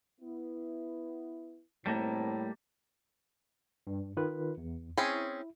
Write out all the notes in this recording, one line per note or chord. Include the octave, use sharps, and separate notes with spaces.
B3 E4
F#2 A2 D#3 G3 A3 A#3 C4
G2
D#3 F4 B4
E2
C4 C#4 E4 G#4